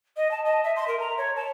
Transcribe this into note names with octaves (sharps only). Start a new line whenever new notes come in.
D#5
A5
D#5
E5
C6
A#4
A#5
C#5
A5